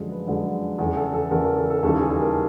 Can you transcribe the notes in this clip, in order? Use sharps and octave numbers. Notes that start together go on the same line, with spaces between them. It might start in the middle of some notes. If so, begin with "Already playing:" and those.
Already playing: F#2 D3 F3 G#3 A4
B4
F#2 D3 F3 G#3
E2 C#3 E3 A4
A4
A4
E2 C#3 E3 A#4
A#4
A4
A4
D#2 C#3 E3 G3 A4
G#4
A4
A#4